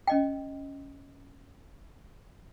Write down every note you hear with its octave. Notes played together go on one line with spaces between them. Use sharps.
C#4 D#5 G5